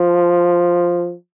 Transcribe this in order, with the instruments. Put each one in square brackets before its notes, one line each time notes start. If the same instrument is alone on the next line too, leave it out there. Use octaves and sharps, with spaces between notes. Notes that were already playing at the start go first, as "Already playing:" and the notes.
Already playing: [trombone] F3